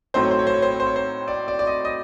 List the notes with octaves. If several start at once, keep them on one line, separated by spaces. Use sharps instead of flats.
A2 F#3 A3 C4 D#4 C5
C#5
C5
C#5
C5
C#5
C5
C#5
C5
C#5
C5
D5
D5
D5
D#5
D#5